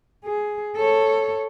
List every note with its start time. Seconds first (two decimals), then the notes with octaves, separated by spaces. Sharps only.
0.25 G#4
0.77 A4 C#5